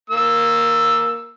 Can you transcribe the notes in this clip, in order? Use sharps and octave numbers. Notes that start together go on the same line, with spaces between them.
A#3 E6